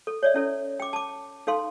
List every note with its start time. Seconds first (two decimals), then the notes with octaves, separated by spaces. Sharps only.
0.07 A4
0.23 C#5 D5 E5
0.34 C#4 E4 A4
0.80 G5 D6
0.93 A5 D6
1.47 D#4 A4 F5 C6